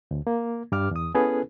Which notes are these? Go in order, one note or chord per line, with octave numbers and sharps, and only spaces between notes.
D2
A#3
G2 G3 D6 F6
E2 D#6
B3 C#4 E4 G#4 A4 B4